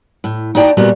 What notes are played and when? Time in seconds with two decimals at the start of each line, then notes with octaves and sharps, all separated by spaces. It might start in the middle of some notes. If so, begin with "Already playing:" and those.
0.24 A2
0.55 D#4 F#4 D5 G5 A5 A#5
0.77 A#2 G3 A3 B3 F#4 A#5